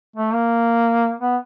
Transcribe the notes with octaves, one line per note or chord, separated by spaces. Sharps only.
A3
A#3
B3